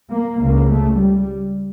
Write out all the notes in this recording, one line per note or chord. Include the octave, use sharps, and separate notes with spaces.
A#3
C#2 C#3 A#3
A3
G3